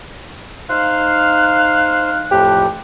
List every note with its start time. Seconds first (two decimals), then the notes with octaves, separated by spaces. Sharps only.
0.69 D#4 C5 F5 F#6
2.31 F2 A2 F3 G4